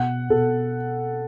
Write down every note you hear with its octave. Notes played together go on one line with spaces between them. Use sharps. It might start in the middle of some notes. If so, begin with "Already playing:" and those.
Already playing: B2 F#5
B2 A4